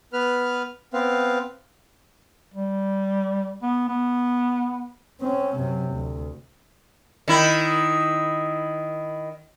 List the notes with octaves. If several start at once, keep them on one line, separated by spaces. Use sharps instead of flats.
B3 B4 F6
B3 C4 F5
G3
B3
B3
C4 C#4
F#2 C3
D2
D#3 E4